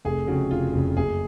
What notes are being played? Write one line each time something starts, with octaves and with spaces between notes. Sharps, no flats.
F1 G#4
F2 C#3 F#4
F1 F4
F2 C#3
F#1 G#4